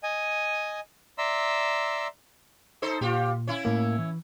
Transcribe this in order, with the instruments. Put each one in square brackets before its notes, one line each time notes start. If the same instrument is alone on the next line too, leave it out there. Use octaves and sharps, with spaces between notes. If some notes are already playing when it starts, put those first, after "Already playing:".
[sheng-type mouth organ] D#5 G#5
D5 E5 A#5 C6 E6
[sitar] D#4 A4 C5
[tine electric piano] A#2 [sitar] F4 G4
[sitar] C#4 E4
[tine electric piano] A2 A#3
E3